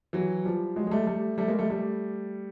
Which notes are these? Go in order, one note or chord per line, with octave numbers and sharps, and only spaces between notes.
E3 F#3
F3 G3
F#3 G#3
G#3
G3 A3
G3 A3
G3 A3
G#3 A#3
G3 A3
G3 A3